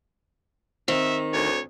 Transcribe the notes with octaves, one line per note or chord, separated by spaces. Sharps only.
D#3 C4 E5
D2 C#5